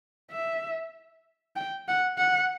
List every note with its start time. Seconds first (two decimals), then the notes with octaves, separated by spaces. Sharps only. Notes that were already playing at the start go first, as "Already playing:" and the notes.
0.31 E5
1.56 G5
1.88 F#5
2.18 F#5